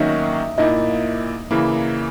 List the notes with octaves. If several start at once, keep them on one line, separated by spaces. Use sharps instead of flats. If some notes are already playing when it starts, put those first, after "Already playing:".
Already playing: D#3 F#3 A#3 C#4 D#4 F#4 D#5 E5
A#2 A#3 D#4 E4 D#5
C#3 E3 A#3 E4